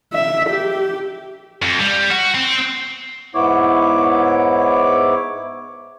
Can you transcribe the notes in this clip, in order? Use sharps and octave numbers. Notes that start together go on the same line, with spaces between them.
E5
G4
F2
G3
F#4
C4
G#2 B3 E4 C#5 D6